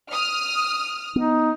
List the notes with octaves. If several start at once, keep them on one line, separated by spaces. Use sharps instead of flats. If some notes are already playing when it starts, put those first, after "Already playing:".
D#6 F6
B3 D#4